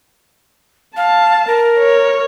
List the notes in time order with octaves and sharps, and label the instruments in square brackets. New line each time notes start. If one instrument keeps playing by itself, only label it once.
[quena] F5 [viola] A5
[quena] A#4
[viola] C#5